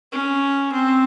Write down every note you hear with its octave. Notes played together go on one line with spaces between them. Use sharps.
C#4
C4